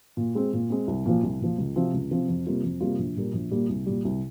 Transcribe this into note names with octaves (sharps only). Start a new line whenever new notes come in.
A#2
G#3 C4
A#2
G#3 C4
C2
A#2 F3
C2
A#2 F3
C#2
C3 F3 C4
C#2
C3 F3 C4
F2
C3 G3 A#3 F4
F2
C3 G3 A#3 F4
A#1
A#2 G3 A#3
A#1
A#2 G3 A#3
C2
A#2 G3
C2